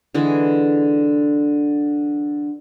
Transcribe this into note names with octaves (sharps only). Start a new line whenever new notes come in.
D3 E3 G#3